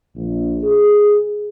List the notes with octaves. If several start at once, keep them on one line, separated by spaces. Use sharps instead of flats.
A#1
G#4